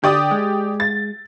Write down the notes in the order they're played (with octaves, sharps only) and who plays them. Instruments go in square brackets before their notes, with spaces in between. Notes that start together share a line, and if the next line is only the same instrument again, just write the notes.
[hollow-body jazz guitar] D3 [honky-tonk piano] G4 D5 D#6
[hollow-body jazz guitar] G#3
[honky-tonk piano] A6